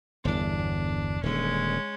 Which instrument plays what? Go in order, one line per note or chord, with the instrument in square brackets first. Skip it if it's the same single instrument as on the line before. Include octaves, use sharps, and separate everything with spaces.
[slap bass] G1 E2 [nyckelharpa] D4
[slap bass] D#1 D3 [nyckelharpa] G#3 C#4